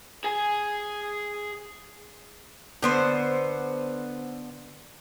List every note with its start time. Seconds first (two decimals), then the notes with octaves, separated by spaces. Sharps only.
0.24 G#4 G#5
2.83 D3 B3 C5